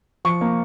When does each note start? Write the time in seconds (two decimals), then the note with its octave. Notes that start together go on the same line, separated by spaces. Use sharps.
0.25 F3 C#6
0.41 A#3